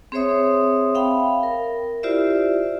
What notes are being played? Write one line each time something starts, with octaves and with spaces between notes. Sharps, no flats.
C4 G#4 C5 C#5 E5 D#6
E5 F5 G5 B5
A#4
E4 F4 G4 C5 D5 E5